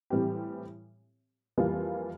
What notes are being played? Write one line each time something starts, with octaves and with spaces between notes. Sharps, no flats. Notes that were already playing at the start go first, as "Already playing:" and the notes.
A2 E3 G3 C4 G4
F2 E3 G3 A#3 F4